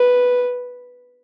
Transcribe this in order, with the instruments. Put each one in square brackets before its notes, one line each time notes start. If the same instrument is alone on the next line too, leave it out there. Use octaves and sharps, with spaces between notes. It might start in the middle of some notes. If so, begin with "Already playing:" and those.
Already playing: [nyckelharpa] B4